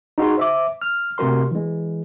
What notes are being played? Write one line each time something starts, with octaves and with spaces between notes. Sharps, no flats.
D#4 F#4 G#4 C6
C5 E5 D6
F6
C3 A3 F#4 A#4 C6
E3 G#3